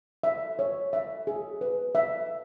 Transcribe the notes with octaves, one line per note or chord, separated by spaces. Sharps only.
E5
C#5
E5
G#4
B4
E5